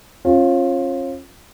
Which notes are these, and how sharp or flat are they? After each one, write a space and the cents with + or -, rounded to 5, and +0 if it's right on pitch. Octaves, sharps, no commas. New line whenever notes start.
C#4 -40 F4 +0